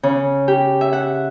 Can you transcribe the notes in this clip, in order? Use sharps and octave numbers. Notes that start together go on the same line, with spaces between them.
C#3
G4
E5
F#5